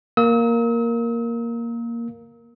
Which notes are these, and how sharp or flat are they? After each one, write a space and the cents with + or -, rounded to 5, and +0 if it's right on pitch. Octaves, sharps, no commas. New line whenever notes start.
A#3 +0 A#4 +0 E6 -45